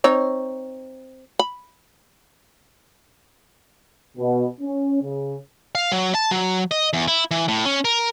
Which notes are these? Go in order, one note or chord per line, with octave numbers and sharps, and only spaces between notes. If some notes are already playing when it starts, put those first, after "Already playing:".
C4 D#4 C#5
B5
B2
C#4
C#3
F5
F#3
A5
F#3
D#5
E2
E4
E3
A2
C#4
A#4